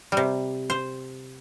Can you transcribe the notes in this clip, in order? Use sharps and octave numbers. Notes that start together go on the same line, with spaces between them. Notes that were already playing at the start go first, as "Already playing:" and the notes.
C3 G3
C5